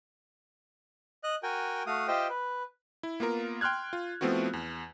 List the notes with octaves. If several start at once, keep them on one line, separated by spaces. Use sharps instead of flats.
D#5 F#6
F#4 A#4 G5 G#5
A3 F#4 F5 D#6
F4 G4 C5 D#5 E5 G5
B4
E4
A#3 B3 F4 A#4
G5 C6 F6 F#6 G#6
F4
F3 A3 B3 C4 E4 F#4
E2